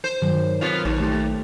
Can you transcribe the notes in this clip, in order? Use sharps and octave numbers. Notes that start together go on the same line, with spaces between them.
C5
G2 D#3 F#3
C3 B3 F4
A#1 D#2
A3 G4